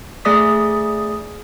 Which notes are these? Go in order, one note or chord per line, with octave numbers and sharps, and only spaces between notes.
A3 G#4 D5 D#6 B6